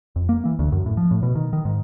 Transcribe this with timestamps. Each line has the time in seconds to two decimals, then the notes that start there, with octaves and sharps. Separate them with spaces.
0.16 F2
0.29 A#3
0.45 E3
0.59 D2
0.72 F#2
0.86 A2
0.97 F3
1.11 A2
1.23 B2
1.35 D#3
1.53 D#3
1.65 G#2